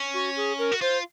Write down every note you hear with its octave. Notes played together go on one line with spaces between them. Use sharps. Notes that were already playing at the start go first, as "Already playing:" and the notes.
Already playing: C#4
F#4
G#4
A#4
F#4
F4 C5